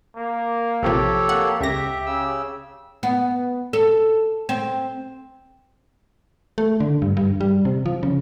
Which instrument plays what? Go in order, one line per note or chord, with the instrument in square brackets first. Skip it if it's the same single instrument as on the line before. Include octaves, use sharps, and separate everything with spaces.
[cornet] A#3
[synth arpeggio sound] A#1 C3 F3 [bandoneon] G4 A4 C#5
[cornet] A#3 [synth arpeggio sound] F#5
[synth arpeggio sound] C#2 A#6 [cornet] G4 [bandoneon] E5
[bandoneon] C#3 E6
[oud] B3
A4
C4
[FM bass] A3
D3
G2
G2
G3
C3
F3
C#3